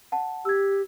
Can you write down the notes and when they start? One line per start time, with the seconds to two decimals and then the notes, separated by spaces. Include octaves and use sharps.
0.12 F#5 A5
0.45 G4 E6 G#6